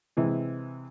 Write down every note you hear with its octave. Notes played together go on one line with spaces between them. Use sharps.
C3 E3 G#3